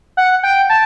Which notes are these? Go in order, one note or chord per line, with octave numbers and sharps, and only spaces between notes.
F#5
G5
A5